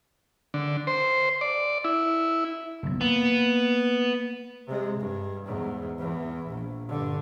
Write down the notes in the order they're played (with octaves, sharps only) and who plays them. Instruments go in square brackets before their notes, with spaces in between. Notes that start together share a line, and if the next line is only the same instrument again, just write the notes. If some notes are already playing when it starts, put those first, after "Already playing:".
[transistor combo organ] D3
C5
D5
E4
[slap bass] F#1 B1
[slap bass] A#3 [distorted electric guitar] B3
[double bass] C3 G#3
G2
E2 G#2
E2 E3
A#1
G2 D3